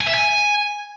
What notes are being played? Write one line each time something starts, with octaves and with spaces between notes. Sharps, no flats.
G#5
E5
G#5